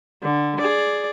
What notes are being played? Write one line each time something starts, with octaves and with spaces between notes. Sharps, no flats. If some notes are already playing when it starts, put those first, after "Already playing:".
D3
G#4 D5